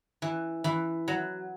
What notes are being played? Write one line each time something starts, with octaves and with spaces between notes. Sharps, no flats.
E3
E3
F#3